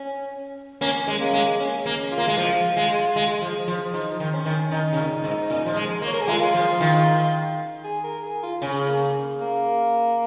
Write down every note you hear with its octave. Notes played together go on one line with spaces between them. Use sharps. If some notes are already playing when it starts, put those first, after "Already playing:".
Already playing: C#4
A#3 C#4
G#3
A#3
G#3
C#4
A#3
F4
A#3
G#3
F3 F4
G#3
G#3
F3
F3
F3 D#4
D#3
C#4
D#3
D#3 D#4
C#3
A#2
G#2
A#2
F3
G#3
A#3
C#5
A#4
G#4
G#3 F4
F3
D#3
G#4
A#4
G#4
F4
C#3 C#4
A#3
A#3